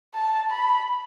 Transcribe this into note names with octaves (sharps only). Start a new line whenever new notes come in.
A5
B5